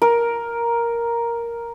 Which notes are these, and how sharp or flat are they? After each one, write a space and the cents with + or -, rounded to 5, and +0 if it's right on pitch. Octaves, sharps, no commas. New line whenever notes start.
A#4 +5